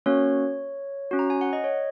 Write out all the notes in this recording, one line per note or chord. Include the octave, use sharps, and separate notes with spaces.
A#3 C#4 F#4 C#5
C#4 F#4
A#5
G#5
F#5
D#5
C#5